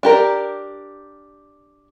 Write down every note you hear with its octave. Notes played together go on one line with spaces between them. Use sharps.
D4 G4 A#4